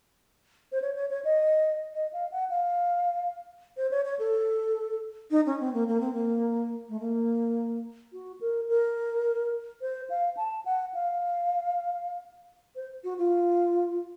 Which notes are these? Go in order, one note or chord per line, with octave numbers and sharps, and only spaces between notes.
C5
C#5
C#5
C#5
D#5
D#5
F5
F#5
F5
C5
C#5
C#5
A4
D#4
C#4
C4
A#3
A#3
C4
A#3
A3
A#3
F#4
A#4
A#4
C5
F5
A5
F#5
F5
C5
F#4
F4